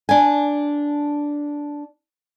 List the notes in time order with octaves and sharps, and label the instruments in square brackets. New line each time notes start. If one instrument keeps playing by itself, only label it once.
[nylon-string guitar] D4 G#5